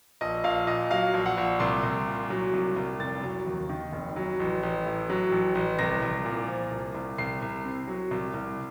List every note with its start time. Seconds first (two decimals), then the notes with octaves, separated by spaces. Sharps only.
0.21 A#1 D#5
0.44 A#1 F5
0.67 A#2 D#5
0.91 F#3 F5
1.14 A#1
1.26 F#5
1.37 A#1
1.60 C2 C6
1.83 C2
2.07 A#2
2.30 F#3
2.53 C2
2.76 C2
3.00 F1 A6
3.23 F#3
3.46 D#2
3.69 D#3
3.93 F1
4.16 F#3
4.40 A1
4.63 A1
4.86 A2
5.10 F#3
5.32 A1
5.55 A1
5.79 C2 A#6
6.02 C2
6.25 A#2
6.48 F3
6.72 C2
6.95 C2
7.18 C2 C7
7.42 C2
7.65 C3
7.88 F#3
8.11 C2
8.34 C2